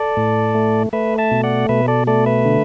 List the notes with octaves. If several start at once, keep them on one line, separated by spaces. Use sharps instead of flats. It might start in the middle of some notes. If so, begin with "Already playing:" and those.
Already playing: A4 D5
A2
A3
A3 B4 E5
E5 A5
B2
D5 F#5
B2 B4 E5
A4 D5
A3 A4 D5
B4 E5
D3